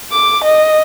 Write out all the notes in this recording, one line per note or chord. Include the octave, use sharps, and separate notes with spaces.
D6
D#5